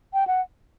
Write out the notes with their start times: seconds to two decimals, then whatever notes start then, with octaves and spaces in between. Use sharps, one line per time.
0.14 G5
0.27 F#5